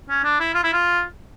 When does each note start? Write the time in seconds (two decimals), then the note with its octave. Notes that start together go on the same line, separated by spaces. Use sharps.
0.09 C#4
0.24 D4
0.40 E4
0.54 F4
0.63 E4
0.73 F4